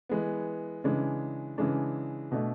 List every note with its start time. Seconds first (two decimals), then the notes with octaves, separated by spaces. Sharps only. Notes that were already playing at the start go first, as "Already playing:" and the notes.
0.09 E3 G#3 B3
0.84 C#3 E3 G#3 D4
1.58 C#3 E3 G#3 D4
2.32 B2 A3 D4